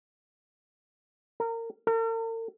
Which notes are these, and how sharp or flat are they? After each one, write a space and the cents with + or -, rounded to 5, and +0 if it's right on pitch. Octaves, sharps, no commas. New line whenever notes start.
A#4 -25
A#4 -45